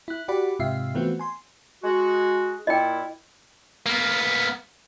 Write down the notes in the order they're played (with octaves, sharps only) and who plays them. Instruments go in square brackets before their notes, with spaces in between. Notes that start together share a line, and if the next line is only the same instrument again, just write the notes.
[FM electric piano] E4 F#6
F#4 G4 D5 F#5 B5
G#2 C3 F4 E5 F5 C7
E3 A3 B3 C4 F4 F#4
G#5 C6
[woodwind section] G#3 F#4
[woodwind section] A#2 E4 [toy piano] D#5 G5
[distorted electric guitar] A#3 B3